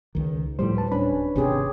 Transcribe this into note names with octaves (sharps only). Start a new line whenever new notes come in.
C#2 D#3
D1 A2 F3 G3 C5
B4 A5
C#4 D4 B4 B5
G#1 C3 C#4 G4 G#4